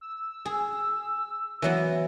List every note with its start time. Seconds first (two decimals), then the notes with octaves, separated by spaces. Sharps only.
0.01 E6
0.45 G#4
1.62 E3 F#3 B3